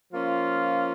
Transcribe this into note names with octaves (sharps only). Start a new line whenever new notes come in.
F3 A#3 C#4 F4